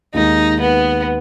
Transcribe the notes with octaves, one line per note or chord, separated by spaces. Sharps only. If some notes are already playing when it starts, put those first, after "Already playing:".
D#2 D#3 G#3 D#4
B3